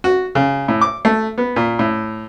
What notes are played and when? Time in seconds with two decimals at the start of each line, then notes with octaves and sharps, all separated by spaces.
0.04 F#4
0.35 C#3
0.68 A2
0.81 D6
1.05 A3
1.38 B3
1.56 A#2
1.79 A2